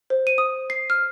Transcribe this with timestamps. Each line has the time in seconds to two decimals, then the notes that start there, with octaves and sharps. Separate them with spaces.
0.10 C5
0.27 D#7
0.38 D#6
0.70 C7
0.90 F6